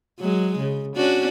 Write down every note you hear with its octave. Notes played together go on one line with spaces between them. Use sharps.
F#3 G#3
C#3
C#4 D4 F#4